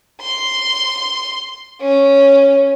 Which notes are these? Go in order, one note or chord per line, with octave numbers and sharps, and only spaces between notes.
C6
C#4